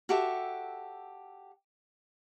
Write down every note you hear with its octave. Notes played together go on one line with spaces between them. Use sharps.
F#4 G4 A4 E5